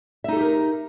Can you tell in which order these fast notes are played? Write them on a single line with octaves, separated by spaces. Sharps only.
E5 D#4 A4 G4 A#4